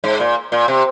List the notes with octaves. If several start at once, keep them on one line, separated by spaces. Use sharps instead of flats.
G#2
A#2
A#2
C3